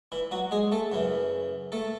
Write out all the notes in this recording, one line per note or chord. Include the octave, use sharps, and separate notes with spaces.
E3 E4
F#3 F#4
G#3 G#4
A3 A4
F#2 C#3 E3
A3 A4